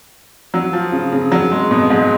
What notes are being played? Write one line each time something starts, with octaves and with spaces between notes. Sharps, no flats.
F#3
F3
C#3
C#3
F#3
G#3
B2
G#2